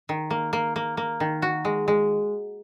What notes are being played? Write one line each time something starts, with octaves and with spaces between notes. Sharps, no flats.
D#3
A#3
A#3
A#3
A#3
D#3
F#4
G#3
G#3